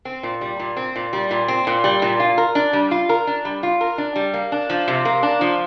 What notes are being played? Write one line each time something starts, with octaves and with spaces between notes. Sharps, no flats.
C4
A#2
G3
A#2
C4
A#2
G3
A#2
C4
A#2
G3
A#2
F4
A#4
D4
G3
F4
A#4
D4
G3
F4
A#4
D4
G3
A#3
D4
F3
C3
A#3
D4
F3